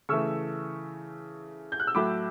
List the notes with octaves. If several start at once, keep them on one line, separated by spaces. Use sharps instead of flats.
C#3 E3 A3 C#6 E6
G6
F#6
E6
A2 F#3 A3 B5 D6